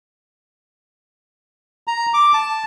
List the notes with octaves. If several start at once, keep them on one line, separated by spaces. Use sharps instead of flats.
A#5
D6
A5